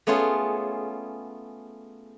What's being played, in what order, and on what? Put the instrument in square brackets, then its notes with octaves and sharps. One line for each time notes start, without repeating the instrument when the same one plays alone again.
[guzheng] A3 B3 C#4 F4 G#4